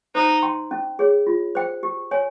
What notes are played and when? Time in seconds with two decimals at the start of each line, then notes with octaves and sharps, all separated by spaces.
0.15 D#4 C5
0.42 G5 C6
0.71 C#4
0.99 G#4 C#5
1.27 F4
1.55 C5 G5
1.83 G4
2.11 C#5 G#5